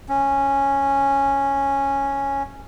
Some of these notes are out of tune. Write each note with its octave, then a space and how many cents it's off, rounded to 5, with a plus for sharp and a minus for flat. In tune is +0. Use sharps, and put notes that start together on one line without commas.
C#4 -10